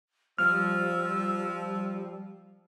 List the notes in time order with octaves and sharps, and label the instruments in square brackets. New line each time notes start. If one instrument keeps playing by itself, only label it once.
[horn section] F3 [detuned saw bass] G3 [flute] E6 [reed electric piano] F6